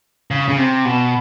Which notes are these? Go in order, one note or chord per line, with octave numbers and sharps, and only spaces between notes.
C#3
C#3
C3
B2